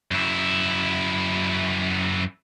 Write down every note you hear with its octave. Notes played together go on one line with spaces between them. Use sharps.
F#2 E4